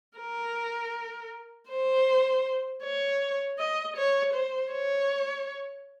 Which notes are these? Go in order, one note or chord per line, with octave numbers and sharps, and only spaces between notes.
A#4
C5
C#5
D#5
C#5
C5
C#5